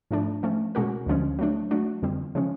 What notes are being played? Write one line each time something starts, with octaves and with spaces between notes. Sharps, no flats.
G#2 F3 A3 D4
F3 A3 C#4
B2 G#3 C#4 F#4 A#4
D2 D3 F3 G#3 C#4
F#3 A3 D4
F#3 A3 D4 F#4
F2 D3 G3 C4
C#3 F3 G#3 C#4